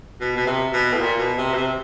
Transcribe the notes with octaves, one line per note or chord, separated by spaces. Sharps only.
B2
B2
C3
B2
A2
A#2
B2
C3
B2
C3